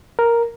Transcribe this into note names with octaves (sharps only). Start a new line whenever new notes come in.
A#4